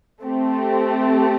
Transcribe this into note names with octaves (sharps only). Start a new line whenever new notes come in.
A3 C4 G4